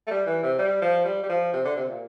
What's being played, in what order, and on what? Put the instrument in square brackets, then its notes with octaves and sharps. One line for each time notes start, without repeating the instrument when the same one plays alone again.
[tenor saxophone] A3
G3
E3
C3
G3
F3
G3
G3
F3
C3
D3
C3
A#2